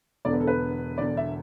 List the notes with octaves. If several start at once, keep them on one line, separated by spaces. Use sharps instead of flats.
E1 E2 D3 D5
B4
A4
B4
E1 E2 D3 D5
E5